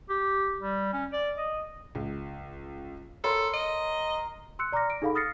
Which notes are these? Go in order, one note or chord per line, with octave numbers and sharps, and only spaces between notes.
G4
G3
C#4
D5
D#5
C#2
A4 A#4 C#5 C6
D#5
C6 E6 F#6 C#7
D5 A#5 C6 D6 F6 A#6
D7
D#4 G#4 A4 F5 F#5 B5
D#6 F6 A6 A#6 C7 C#7